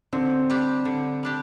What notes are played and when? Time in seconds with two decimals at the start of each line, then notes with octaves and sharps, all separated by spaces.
0.13 D3 C4
0.50 G3 D4 G4
0.85 D3
1.23 G3 D4 G4